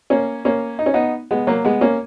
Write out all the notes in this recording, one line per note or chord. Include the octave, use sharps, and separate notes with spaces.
A#3 C#4
A#3 C#4
D#4
C#4
B3 D#4
G#3 B3
F#3 A#3
G#3 B3
A#3 C#4